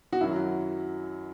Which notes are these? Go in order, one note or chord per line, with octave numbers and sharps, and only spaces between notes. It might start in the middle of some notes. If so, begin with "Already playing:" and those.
F#4
F#2 D#3 F#3 E4